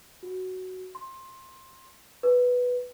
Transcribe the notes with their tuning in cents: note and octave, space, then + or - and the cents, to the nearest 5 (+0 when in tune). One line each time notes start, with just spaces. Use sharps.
F#4 +5
C6 +15
B4 +0